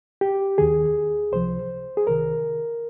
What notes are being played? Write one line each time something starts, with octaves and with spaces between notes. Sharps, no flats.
G4
D#2 D#3 G#4
C#2 C3 F3 C5
G#4
C2 C3 D#3 A#4